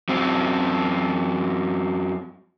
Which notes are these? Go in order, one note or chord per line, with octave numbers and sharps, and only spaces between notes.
F#2 C4